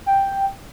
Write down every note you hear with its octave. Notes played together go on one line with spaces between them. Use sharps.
G5